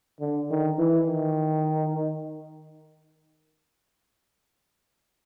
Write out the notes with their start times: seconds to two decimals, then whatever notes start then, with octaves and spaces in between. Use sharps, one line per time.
0.21 D3
0.50 D#3
0.79 E3
1.07 D#3